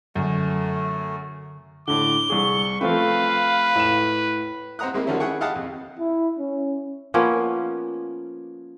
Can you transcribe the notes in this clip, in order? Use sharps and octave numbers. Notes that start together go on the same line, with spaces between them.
F#2 D3 A3
A2 D3 D6 G7
C2 G#4 C#6
F3 A3 C4 B4 F5
A2 E7
C4 C5 F#5 A#5 D#6 F#6
G#3 A#3 C4 E4 G4 A#4
D3 D#3 F3 G3 C#4 E4
E4 G#4 F#5 G5 C#6
E4 G4 F5 F#5 A5 D#6
F2
E4
C#4
F3 A#3 B3 C#4